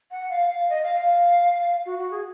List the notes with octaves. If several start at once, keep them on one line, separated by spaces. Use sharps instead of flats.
F#5
F5
F5
D#5
F5
F5
F#4
F#4
G#4